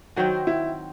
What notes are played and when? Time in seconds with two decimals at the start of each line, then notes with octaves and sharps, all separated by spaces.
0.16 D#3 F#3 C4 F#4
0.47 E4